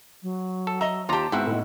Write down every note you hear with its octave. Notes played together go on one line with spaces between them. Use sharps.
F#3
A4
D#5 E5 A#5
D#2 F4 G4 A5 A#5 D6
G#2 B3 C4 E4 F#4 G5
A2 D#4